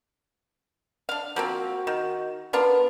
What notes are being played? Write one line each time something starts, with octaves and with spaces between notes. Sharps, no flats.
D4 F5
F3 A#3 C4 F#4
D#3
B3 D4 F4 A#4